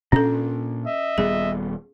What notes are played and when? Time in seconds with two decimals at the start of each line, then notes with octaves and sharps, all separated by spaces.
0.12 A#2 C#4 D4 A4
0.85 D#5 E5
1.18 D#1 G3 B3 G#4